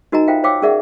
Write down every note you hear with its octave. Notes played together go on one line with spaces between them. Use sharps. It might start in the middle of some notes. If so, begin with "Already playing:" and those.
D#4 F#4 A#4 D#5 G#5 A#5
F4 A4 C5 E5 F5 G5
C5 C#5 F5 G5 D6 E6
C#4 G#4 A#4 D5 E5 F#5